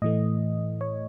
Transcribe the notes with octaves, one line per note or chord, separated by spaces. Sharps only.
A2 E3 A3 D#5
C#5